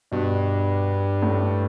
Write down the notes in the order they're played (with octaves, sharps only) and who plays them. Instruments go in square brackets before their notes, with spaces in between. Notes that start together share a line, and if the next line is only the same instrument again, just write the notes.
[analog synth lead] G2 [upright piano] B2
[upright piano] A2